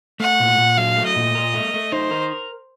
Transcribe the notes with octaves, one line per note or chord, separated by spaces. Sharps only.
A3 F#5
A#2
A#2
F#3 F5
A3
D#5
A#2
A#4
A3
A3
D#4 C5
A#4